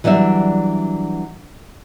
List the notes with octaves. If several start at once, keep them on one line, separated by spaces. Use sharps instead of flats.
E3 F#3 G3 D4 E5